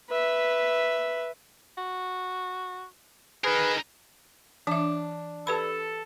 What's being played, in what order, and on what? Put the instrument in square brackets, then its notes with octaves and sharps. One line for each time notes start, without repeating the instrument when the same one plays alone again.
[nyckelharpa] B4 E5
[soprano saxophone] F#4
[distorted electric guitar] D#4 A#4 [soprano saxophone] G#4 [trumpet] B4
[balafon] E3 E5 [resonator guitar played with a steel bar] D4
[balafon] G4 B4 B5 [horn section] A4